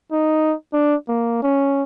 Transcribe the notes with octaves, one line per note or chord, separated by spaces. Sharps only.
D#4
D4
A#3
C#4